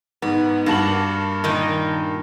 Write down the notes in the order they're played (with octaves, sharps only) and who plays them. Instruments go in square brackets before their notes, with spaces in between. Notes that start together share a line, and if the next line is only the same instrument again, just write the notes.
[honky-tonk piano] G#2 [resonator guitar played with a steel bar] B3
[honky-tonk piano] G2 A5 F#7 [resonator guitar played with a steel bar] A#3 F#4
[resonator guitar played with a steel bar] A#2 D#3 D#4